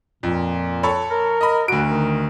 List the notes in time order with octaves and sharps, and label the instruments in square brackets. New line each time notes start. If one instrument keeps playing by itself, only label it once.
[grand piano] F2 [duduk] A#2
[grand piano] A4 C#5 B5
[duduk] A#4
[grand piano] D#5 B5
[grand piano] D2 D7 [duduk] F#4
[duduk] D#3